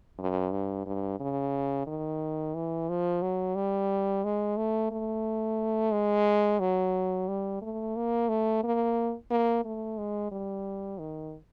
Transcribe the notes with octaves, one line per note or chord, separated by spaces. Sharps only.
F#2
G2
G2
C#3
D#3
E3
F3
F#3
G3
G#3
A3
A3
G#3
F#3
G3
A3
A#3
A3
A#3
A#3
A3
G#3
G3
D#3